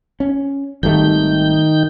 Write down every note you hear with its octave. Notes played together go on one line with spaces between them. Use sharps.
C#4
G#1 D#3 G3 A3 G6